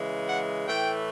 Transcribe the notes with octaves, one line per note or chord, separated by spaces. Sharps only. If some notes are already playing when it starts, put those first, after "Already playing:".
Already playing: C#3 E3 G#3
F#5
A2 E3 A3 G5